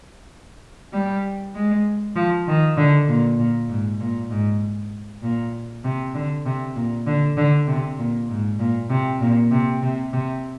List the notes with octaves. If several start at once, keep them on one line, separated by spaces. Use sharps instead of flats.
G3
G#3
F3
D#3
D3
A#2
A#2
G#2
A#2
G#2
A#2
C3
D3
C3
A#2
D3
D3
C3
A#2
G#2
A#2
C3
A#2
C3
C3
C3